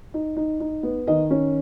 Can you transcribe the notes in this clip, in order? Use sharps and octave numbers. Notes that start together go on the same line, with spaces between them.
D#4
D#4
D#4
B3
D#3 D#5
C#4